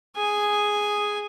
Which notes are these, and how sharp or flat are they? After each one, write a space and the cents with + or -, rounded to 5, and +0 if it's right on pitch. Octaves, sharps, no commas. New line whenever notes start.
G#4 +0 G#5 +0